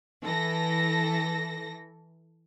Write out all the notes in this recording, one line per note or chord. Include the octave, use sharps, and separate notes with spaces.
E3 A4 A#6